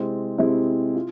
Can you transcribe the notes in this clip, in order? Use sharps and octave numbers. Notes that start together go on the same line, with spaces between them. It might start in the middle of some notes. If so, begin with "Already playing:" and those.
Already playing: C3 G#3 C4 E4
C3 G#3 C4 E4
F4